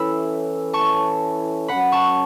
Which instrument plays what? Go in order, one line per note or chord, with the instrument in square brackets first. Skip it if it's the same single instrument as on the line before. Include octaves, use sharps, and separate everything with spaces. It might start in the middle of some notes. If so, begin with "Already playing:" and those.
Already playing: [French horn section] E3 C#4 E4 A4 C#5 [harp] B5 E6
[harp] A5 C#6
[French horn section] F#2 F#3 C#4 [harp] F#5 B5
[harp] A5 C#6